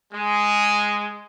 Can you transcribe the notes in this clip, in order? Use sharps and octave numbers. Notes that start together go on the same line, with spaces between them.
G#3